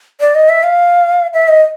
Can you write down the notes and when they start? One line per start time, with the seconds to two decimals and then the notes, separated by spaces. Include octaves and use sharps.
0.20 D5
0.35 D#5
0.49 E5
0.63 F5
1.34 E5
1.48 D#5